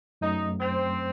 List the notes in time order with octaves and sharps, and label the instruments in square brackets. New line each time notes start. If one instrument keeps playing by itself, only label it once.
[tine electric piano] F#2 F#3 A3 [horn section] D#4
[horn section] C4